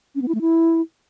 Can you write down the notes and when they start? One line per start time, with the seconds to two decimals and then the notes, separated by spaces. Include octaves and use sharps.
0.15 C#4
0.22 B3
0.28 E4
0.35 A3
0.41 E4